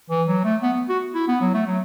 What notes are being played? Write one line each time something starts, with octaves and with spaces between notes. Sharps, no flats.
E3
F#3
A3
B3
F#4
E4
B3
F#3
A3
F#3